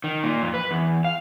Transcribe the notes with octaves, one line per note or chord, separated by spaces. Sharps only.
D#3
A#2
F2
B4
E2
F5